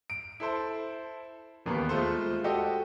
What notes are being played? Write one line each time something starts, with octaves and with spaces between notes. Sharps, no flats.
D7
E4 A4 C5 A5
E1 D#2 A#3 B3 B4
G#3 A3 F4 A4 C5
F#4 G4 A4 D#5